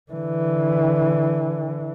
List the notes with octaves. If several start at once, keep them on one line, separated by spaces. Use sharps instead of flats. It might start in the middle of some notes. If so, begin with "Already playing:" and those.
D3 E3